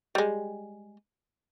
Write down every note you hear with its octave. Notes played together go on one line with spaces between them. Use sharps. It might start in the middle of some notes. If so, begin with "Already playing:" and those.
G3 G#3